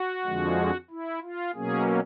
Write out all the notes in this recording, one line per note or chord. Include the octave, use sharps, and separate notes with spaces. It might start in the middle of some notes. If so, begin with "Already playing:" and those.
Already playing: F#4
F2 D3 F3 G#3
E4
F4
B2 F#3 A#3 C#4 G#4